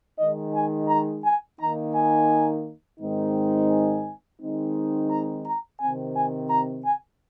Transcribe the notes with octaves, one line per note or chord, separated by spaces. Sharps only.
D#3 G#3 D#4 D#5
G#5
A#5
G#5
D#3 A#3 D#4 A#5
G#5
G#2 D#3 G#3 C4 D#4
G#5
D#3 G#3 C4 D#4
A#5
A#5
C3 D#3 C4 G#5
G#5
A#5
G#5